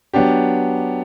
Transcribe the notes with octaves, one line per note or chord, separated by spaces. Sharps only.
F#3 B3 D4 G4